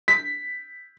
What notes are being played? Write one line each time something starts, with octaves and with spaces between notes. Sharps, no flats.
B6